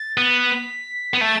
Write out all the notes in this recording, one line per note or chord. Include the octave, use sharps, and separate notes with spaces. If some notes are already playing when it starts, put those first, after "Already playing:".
Already playing: A6
B3
B6
B3
A3 A6